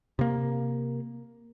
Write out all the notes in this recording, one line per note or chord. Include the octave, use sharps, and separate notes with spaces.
C3 A#3